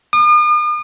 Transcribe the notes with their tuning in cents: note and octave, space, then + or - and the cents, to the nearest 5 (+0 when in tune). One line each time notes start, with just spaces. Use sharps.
D#6 -45